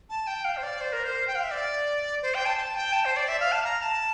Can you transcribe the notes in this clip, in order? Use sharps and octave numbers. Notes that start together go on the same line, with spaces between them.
A5
G5
F5
C5
D5
C5
A#4
C5
G5
F5
E5
D5
C5
G5
A5
A5
G5
A5
C5
D5
E5
F5
A5
A#5
A5